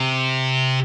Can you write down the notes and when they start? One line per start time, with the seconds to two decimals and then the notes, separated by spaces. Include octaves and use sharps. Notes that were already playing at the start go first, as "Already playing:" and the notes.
Already playing: C3